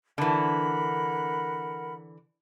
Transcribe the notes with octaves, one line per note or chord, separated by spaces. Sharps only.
D3 E3 A#4 F#5 B5